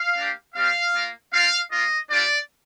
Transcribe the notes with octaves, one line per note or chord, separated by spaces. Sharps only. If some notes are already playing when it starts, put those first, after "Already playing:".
Already playing: F5
A#3 D4 G4
G3 C4 G4 F5
A#3 F4
C4 F4 F5
A#3 F4 D#5
G3 D4 F4 D5